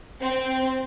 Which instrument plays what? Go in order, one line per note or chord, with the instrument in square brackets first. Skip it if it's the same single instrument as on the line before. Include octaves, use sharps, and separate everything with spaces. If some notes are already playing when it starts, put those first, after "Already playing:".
[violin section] C4